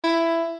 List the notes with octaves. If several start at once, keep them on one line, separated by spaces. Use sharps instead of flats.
E4